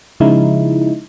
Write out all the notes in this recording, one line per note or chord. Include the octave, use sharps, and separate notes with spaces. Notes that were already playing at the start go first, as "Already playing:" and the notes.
C#3 F3 G#3 D#4 E4